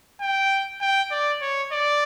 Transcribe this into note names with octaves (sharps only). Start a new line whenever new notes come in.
G5
G5
D5
C#5
D5